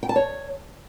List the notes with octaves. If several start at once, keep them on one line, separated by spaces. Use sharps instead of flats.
G5
A5
C#5